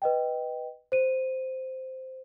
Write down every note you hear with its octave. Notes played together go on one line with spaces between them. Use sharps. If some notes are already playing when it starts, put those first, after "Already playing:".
B4 D#5 G5
C5 D#7